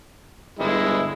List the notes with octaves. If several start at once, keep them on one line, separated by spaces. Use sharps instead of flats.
G1 G#3 E4